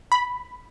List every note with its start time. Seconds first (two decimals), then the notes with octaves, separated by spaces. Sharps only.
0.12 B5